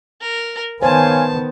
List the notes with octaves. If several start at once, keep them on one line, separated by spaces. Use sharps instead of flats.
A#4
D#3 B3 C5 C#5 F5 G#5 A5